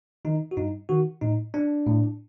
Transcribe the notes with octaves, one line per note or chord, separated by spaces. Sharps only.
D#3 D#4
F#4
G2 D#4
D#3 F#4
A2 D#4
D4
A2